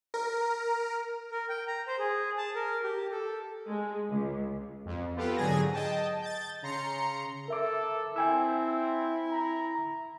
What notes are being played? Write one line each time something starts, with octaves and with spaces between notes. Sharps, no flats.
A#4
A#4
G5
A#5
C5
G#4
A5
A#4
G4
A4
G#3
C#2
F2
B3 F4 G4 A4 B4
G#2 D3 F#3 G#4 G#6 A#6
D#5 G5 A5
G6 A6
C#3 A#5 C6 C#7
A4 A#4 E5 D6
C4 E4 G5 G#5 E6
A#5